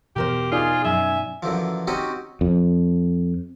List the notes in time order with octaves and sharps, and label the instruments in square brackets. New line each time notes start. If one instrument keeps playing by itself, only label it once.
[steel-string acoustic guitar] E2 A#4 C5 [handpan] B2 [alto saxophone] G4
[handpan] D#4 D5 [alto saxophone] F4 [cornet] G#4
[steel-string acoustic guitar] F#2 [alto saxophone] E5 [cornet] G#5
[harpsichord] F#2 D3 E3 F3
C4 C#4 D#4 F#4 G4 D#5
[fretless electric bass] F2